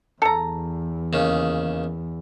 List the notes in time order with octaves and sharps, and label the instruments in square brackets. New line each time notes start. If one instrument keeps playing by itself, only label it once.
[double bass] E2 [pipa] A4 A#5
[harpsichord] D#2 C#3